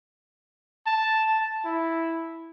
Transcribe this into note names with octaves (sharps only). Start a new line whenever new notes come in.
A5
E4